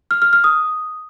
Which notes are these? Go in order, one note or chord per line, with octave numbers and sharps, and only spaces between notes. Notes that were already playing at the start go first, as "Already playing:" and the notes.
F6
F6
F6
D#6